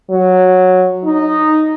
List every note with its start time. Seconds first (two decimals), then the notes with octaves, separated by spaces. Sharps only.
0.10 F#3
1.05 D#4